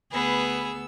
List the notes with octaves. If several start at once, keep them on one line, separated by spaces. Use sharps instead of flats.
D2 B3 G#4 B4 E6